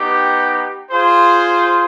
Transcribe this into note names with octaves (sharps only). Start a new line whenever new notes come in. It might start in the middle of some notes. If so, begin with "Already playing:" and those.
Already playing: B3 D#4 G4
F4 G#4 C5